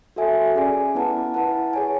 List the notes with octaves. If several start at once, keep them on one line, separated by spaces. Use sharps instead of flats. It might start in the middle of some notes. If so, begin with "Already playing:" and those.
F#4 A4 E5 G#5
C#4 G#4 D5 G#5
B3 E4 B4 F#5 A5
E4 B4 F#5 A5
G#4 C#5 G#5